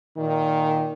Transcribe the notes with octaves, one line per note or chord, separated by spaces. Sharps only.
A#2 D#3